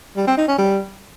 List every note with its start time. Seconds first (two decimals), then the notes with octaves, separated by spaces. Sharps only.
0.17 G3
0.27 C4
0.37 D#4
0.48 C#4
0.58 G3